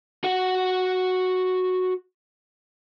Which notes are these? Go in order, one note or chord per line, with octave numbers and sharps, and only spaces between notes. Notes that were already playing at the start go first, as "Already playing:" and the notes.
F#4 F#5